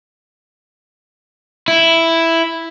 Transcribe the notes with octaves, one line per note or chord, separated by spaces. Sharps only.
E4